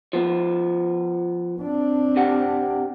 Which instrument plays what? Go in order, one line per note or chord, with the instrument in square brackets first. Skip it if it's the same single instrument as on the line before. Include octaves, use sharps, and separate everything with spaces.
[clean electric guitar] F3 B3
[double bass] C4 D4
[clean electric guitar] C3 G4 F#5